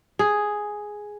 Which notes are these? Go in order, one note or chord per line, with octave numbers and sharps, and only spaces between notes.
G#4